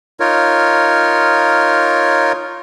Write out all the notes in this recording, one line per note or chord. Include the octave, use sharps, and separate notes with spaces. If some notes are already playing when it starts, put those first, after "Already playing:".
D#4 F4 A#4 C#5